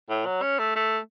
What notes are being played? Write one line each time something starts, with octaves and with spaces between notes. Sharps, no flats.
A2
F#3
C#4
A3
A3